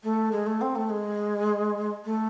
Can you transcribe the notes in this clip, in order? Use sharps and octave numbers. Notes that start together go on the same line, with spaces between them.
A3
G#3
A3
C4
A3
G#3
A3